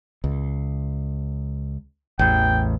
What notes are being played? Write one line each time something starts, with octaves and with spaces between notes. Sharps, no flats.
C#2
A1 E2 G5